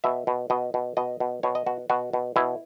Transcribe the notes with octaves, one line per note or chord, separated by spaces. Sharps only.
B2 E5
B2
B2 D#5
B2
B2 D#5
B2
B2 C#5
D#5
B2 F#4
B2 F#4
B2
B2 E4